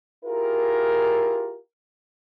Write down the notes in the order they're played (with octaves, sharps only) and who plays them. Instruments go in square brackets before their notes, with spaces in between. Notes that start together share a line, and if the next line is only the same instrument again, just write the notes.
[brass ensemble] E4 F4 G4 G#4 A#4